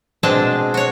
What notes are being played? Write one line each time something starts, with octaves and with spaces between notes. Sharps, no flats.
B2 G#3 C4 D4 G#4 A5
F#4 C#5